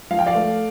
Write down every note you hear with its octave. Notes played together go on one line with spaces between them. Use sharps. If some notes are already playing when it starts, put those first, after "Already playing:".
F3 F5
G5
D5 F5
A3